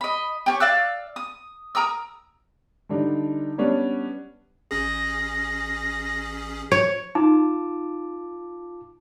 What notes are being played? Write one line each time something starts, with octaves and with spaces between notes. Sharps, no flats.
D#5 B5
G4 G#4 C#5
D5 F5 E6 F#6
D#6
A#4 A#5 D#6 E6
D3 G3 D4 D#4
G3 B3 C#4 D4
A1 C#4 G#4 A#6
C#5
D#4 F4 A5 D6